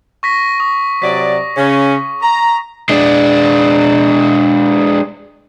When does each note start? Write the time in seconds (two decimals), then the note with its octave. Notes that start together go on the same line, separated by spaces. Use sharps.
0.23 C#6 A#6 B6
0.60 C#6 D#6
1.02 C3 F#3 D5 B6
1.57 C#3 C#4
2.22 A#5
2.89 G#3 D4